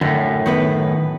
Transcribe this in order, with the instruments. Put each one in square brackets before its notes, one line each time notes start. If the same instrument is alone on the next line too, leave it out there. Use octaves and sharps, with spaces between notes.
[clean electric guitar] F#2 A2 [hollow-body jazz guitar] D3
[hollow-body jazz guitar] D#3 B3 B4